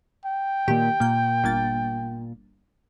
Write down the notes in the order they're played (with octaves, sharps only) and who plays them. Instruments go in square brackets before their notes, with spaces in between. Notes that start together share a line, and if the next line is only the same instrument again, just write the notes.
[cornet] G5
[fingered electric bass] A#2 A#3 [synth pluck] D#3 G4
[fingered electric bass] A#2 [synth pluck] A#3 G6
[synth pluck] G1 A#3 A6